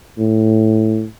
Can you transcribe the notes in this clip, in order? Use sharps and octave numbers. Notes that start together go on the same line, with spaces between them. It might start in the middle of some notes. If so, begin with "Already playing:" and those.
A2